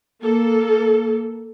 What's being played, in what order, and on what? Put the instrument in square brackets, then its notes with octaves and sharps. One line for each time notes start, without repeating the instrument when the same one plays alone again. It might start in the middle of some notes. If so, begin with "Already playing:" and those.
[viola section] A#3 A4